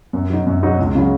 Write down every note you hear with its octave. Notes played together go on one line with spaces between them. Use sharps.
F#2
F#3 D#4
F#2
F#3 D#4
C#2
C#3 F#3